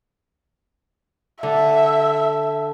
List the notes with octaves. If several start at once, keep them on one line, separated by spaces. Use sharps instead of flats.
D3 E5